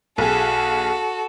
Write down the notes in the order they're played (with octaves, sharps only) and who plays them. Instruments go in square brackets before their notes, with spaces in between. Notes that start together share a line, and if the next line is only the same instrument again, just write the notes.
[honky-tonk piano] B1 G#4 [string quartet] F#4 A4